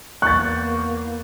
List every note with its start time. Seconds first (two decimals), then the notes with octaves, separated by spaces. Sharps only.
0.22 E2 A#3 C#6 F#6 G6 A6